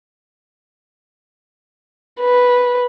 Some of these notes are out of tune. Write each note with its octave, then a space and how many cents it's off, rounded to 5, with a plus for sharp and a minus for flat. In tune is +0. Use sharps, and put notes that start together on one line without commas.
B4 -5